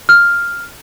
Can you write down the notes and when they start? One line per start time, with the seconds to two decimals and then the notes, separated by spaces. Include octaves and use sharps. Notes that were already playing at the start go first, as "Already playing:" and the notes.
0.09 F6